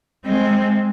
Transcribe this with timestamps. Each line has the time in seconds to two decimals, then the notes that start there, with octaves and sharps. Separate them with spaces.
0.25 G#3 C4